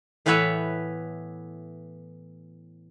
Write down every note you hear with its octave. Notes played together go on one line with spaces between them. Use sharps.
A2 E3 B3 B4 C#5 E5